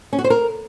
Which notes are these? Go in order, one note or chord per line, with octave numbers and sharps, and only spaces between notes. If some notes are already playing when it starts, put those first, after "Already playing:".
C#4
F#4
C5
A#4